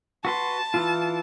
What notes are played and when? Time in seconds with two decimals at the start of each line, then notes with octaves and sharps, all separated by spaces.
0.25 F#4 B4 A5 C6
0.74 E3 E4 F4